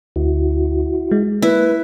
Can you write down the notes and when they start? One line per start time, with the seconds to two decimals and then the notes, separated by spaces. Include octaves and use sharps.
0.16 D2 E4 F#4
1.11 G#3
1.42 A#3 E4 B4